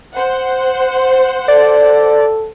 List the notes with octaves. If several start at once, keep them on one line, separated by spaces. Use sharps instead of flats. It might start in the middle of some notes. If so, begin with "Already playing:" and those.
C5 F#5
A4 D5